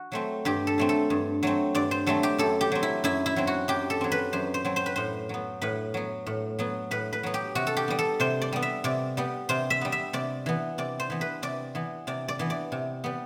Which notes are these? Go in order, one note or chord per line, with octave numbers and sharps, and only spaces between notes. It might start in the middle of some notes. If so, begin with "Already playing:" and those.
Already playing: F#4
F#3 A3 C4
G2 G4
A4
F#3 A3 C4
A4
G2
F#3 A3 C4
G2 D5
C5
F#3 A3 C4 A4
G4
F#2 A4
G4
F#3 C4
E4
F#2 E4
E4
F#3 C4
F#4
F#2 G4
A4
F#3 C4
B4
F#2 C5
C5
F#3 C4
C5
B4
A2 C5
F#3 B3
A2 B4
F#3 B3
A2
F#3 B3
A2 B4
B4
F#3 B3
G4
C3 F#4
A4
G4
G3 B3
A4
C3 C5
D5
G3 B3
E5
C3 D5
G3 B3
C3 C5
E5
G3 B3
E5
C3 D5
E3 B3
C3 D5
C5
E3 B3
B4
C3 D5
E3 B3
C3 D5
D5
E3 B3
D5
C3
G3 B3